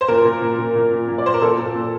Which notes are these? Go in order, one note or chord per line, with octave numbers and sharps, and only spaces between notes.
C5
A#2 A#4
A#2
A#2
A#2
A#2
A#2
A#2
D5
A#2 C5
A#4
A#2 A4
A#2
A#2